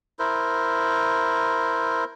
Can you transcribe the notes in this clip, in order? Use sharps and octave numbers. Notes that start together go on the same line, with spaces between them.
E4 A#4 C5